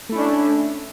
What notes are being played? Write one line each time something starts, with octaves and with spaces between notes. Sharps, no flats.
A3 C#4 D4 E4